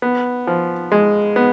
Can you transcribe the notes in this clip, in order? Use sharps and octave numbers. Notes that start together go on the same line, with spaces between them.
B3
F3
G#3
B3